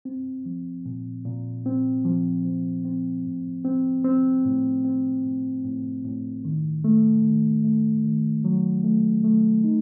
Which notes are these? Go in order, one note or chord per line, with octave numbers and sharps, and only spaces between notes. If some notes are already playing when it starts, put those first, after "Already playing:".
C4
F3
A#2
A#2
C4
F3
F3
C4
A2
C4
C4
A2
C4
A2
A2
A2
D#3
A3
D#3
A3
D#3
F#3
A3
A3
D#4